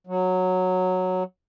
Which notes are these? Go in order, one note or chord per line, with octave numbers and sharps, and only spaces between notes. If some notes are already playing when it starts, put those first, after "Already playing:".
F#3